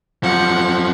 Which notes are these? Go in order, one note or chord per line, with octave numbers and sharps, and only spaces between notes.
F#2 F3 F#5